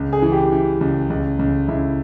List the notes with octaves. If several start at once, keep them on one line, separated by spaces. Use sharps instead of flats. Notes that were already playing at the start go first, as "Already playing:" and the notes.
Already playing: C#2
G#4
E3
G4
E3
C#2
C#2
C#2
C#2 E4